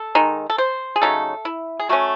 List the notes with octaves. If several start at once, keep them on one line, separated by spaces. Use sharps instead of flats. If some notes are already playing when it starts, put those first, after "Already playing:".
Already playing: A4
D#3 G#3 D#4
A4
C5
G#4
C#3 F#3 A3 D#4 A4
E4
G#4
F#3 A3 C#4 F#4